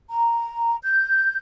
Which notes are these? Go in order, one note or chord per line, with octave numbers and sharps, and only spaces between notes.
A#5
G6